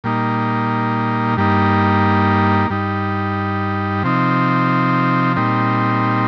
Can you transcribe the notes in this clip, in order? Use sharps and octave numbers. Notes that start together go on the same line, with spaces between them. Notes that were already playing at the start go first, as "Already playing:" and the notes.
A#2 G3 A#3 D#4
G2 G3 A#3 D#4
G2 G3 D#4
C3 F3 C4 D#4
A#2 G3 C4 D#4